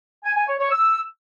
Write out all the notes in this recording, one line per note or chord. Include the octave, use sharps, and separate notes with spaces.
G#5
G#5
C#5
C#5
E6